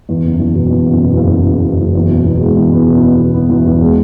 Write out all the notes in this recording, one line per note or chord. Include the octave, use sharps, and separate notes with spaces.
E2
F#1
E2
B2
E2
F#1
B2
F#1
F#1
F#1
F#1
F#1
E2
B2
B2
G#3
E2
B3
B2
B3
B2
B3
E2
E2
G#3